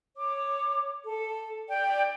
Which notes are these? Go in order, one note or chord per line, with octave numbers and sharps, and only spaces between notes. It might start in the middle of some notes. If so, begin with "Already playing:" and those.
C#5 D6
A4
D5 G5